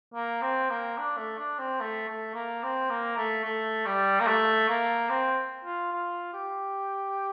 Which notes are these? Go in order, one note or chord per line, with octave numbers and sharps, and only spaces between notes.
A#3
C4
A#3
D4
A3
D4
C4
A3
A3
A#3
C4
A#3
A3
A3
G3
A#3
A3
A#3
C4
F4
F4
G4